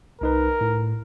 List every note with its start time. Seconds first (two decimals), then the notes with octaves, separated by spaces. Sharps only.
0.21 C2 D#4 A#4 B4
0.61 A2